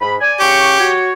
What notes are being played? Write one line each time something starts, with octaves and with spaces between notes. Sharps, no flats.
G#2 B5
D5 G#5
C#3 C#4 G4 C#6
F#4 C#5